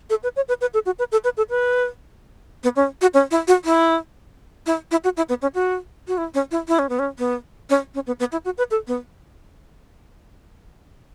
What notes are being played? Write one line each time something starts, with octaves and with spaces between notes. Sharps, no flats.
A4
B4
C#5
B4
B4
A4
F#4
B4
A4
B4
A4
B4
B3
C#4
F#4
C#4
E4
F#4
E4
E4
E4
F#4
E4
B3
C#4
F#4
F#4
E4
C#4
E4
E4
C#4
B3
C#4
B3
C#4
C#4
B3
B3
E4
F#4
B4
A4
B3